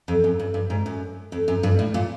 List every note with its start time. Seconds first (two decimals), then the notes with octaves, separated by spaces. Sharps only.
0.08 F2
0.24 F#2
0.40 G2
0.54 G2
0.70 G#2
0.86 F#2
1.32 F2
1.48 F#2
1.63 G2
1.79 A2
1.94 A#2